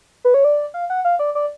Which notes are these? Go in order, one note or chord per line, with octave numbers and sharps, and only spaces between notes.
B4
C#5
D5
F5
F#5
F5
D5
D5